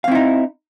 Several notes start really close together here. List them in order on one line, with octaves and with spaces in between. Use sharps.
F5 C4 E4 D#4